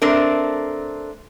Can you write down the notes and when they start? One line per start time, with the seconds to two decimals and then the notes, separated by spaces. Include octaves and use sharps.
0.02 A3 C4 D4 A#4